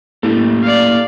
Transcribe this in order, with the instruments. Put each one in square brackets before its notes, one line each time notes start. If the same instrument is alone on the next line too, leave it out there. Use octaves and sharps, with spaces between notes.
[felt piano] A2 [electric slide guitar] A#3 G4 A4
[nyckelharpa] D5 F5